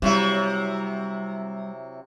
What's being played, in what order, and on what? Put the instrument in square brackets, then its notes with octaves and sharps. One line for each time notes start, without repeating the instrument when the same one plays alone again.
[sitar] C3 F#3 E4 [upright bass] G3